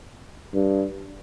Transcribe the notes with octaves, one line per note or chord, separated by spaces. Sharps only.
G2